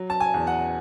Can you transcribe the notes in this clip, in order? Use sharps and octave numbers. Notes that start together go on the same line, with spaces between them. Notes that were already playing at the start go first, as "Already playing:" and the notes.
Already playing: F#3
A5
G#5
E2
F#5